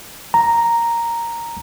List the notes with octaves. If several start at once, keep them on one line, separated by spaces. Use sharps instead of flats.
A#5